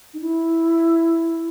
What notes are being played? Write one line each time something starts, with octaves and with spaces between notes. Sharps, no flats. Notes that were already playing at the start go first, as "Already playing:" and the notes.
D#4
E4